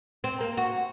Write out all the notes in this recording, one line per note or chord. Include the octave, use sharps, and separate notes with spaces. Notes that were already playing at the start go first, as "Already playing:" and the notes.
C4
A#3
F#4